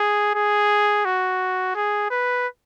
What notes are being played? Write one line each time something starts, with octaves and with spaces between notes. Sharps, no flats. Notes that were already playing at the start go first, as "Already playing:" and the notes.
Already playing: G#4
G#4
F#4
G#4
B4